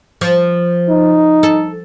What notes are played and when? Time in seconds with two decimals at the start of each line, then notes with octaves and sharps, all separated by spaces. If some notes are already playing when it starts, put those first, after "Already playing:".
0.21 F3
0.89 D#4
1.43 A4